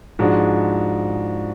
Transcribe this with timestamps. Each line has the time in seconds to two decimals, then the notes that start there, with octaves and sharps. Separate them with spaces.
0.19 G#2 F3 G#3 D4 F#4